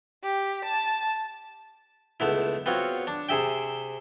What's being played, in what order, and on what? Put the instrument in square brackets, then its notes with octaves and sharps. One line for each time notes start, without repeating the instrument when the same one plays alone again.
[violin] G4
A5
[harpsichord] C#2 A3 B3 E4
B3 C4 F4 F#4 C#5
D4
C3 G#4 E5 G5